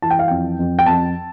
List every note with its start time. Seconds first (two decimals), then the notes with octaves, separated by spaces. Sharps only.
0.02 E3 A5
0.10 G5
0.19 F5
0.28 F2 G5
0.59 F2
0.79 G5
0.86 F2 A5